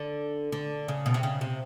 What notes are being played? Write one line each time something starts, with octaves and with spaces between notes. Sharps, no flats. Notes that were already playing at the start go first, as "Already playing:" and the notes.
Already playing: D3
D3
C#3
B2
C3
C#3
C3